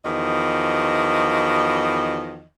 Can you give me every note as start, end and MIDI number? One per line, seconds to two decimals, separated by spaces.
0.04 2.44 40
0.04 2.44 51
0.04 2.44 53
0.04 2.44 66
0.04 2.44 75